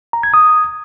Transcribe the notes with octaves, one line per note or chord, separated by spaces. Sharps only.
A#5
G#6
D#6